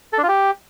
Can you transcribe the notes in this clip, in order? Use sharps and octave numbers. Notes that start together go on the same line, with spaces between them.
A4
D4
F4
G4